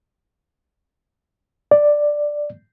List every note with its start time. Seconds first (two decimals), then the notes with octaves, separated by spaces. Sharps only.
1.71 D5